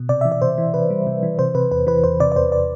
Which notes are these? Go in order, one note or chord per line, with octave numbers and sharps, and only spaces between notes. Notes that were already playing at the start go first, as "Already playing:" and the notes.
Already playing: B2
C3 D5
E3 E5
D5
C3 C5
E3
C3 B4
G3
C3
E3
C3 C5
C3 B4
E2 B4
E3 B4
E2 C5
C3 D5
D5
E2 C5
D5